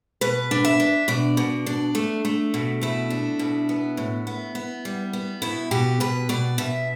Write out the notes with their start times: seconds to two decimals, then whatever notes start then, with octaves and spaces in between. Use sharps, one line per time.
0.21 B2 B4
0.51 D4
0.65 E5
0.80 D4
1.08 B2 D5
1.37 B2
1.66 D4
1.95 A3
2.25 A3
2.54 B2
2.81 A3 E4
3.10 D4
3.39 B2
3.69 B3
3.97 A2
4.27 B3
4.55 B3
4.85 G3
5.13 B3
5.42 B2 E4
5.71 B2 G4
6.00 B2 B4
6.29 B2 D5
6.58 B2 E5